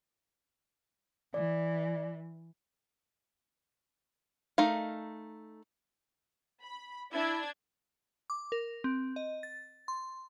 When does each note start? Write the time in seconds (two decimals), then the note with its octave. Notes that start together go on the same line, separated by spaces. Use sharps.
1.34 E3 D5
4.58 A3 D#4 A#4 F5
6.62 B5
7.13 D4 E4 D5 G#6
8.30 D6
8.52 A#4
8.84 C4
9.16 D#5
9.43 A6
9.88 C6